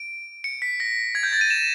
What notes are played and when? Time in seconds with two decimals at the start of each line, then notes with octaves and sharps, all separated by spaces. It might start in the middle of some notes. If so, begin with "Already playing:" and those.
Already playing: D7
0.44 C#7
0.62 B6
0.80 A#6
1.15 G#6
1.23 G6
1.33 A6
1.41 D#7
1.50 E7